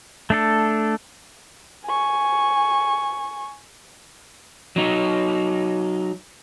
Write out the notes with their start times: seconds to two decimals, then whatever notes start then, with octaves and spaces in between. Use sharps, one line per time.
0.30 A3 D4 A4
1.86 G#5 C#6
4.76 F#3 D#4